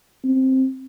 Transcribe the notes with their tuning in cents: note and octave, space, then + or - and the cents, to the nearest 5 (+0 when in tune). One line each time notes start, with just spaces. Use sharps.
C4 +5